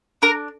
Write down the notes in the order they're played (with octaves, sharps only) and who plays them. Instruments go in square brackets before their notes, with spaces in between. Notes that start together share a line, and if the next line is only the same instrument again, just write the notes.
[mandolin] D4 A#4 A#5